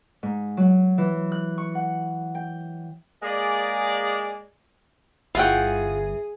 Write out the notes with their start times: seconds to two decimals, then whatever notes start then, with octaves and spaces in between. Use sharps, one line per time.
0.23 G#2
0.57 F#3
0.98 E3
1.32 F#6
1.58 C#6
1.75 F#5
2.35 G5
3.23 G#3 A#3 G#4 D5
5.35 G1 E3 F4 G#4 F#5 G5 C#6